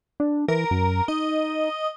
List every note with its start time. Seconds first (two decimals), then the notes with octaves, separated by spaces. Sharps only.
0.20 D4
0.48 E3 A#4
0.71 F#2
1.08 D#4 D#5